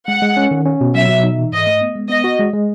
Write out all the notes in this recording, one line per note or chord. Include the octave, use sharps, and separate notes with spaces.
G#3 F#5
G#3
C#4
D#3
C#4
B2
F#3 E5
B2
D#4
E3
G#2 D#5
A3
B3
G#3
B3 D#5
F#4
G#3
G#3